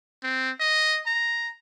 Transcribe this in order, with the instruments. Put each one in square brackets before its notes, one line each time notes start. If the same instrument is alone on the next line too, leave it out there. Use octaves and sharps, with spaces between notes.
[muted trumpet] C4
D#5
A#5